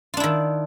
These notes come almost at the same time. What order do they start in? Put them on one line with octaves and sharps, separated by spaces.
F4 D4 E4 D#3